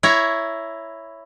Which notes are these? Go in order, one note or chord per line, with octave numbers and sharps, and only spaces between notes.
E4 C#5 A#5